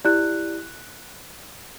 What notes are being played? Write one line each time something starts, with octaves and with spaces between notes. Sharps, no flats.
E4 G4 D5 F#6